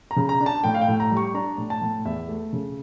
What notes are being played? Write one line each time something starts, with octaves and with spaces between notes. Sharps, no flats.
A#5
C#3
A#5
D4
A5
A2 G5
F5
G5
A2
A#5
G3
C#6
D4 A#5
A2
A5
A2
E2 E5
A3
C#3